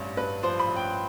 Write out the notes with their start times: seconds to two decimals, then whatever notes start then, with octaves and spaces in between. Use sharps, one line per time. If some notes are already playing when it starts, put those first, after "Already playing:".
Already playing: A1 G2
0.17 G2 B4
0.43 F3 C5
0.60 B5
0.68 A1
0.76 G5